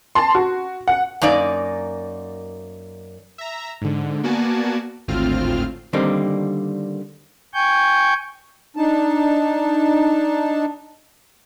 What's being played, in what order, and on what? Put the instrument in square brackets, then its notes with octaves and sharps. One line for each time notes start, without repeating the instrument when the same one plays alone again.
[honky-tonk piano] A5 C6
F#4
F#5
[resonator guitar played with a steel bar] F#2 A#3 D#4 D5
[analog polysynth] E5 A#5
G#2 D3
A#3 B3 F#4 D5 G#5 A5
G#1 D2 A2 C4 F4 F6
[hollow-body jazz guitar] D3 D#3 G3 A#3 C4
[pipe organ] G5 G#5 C#6 G6
[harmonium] D4 D#4 A5